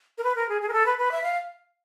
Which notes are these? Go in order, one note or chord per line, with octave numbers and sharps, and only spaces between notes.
A#4
B4
A#4
G#4
G#4
A#4
A4
B4
B4
E5
F5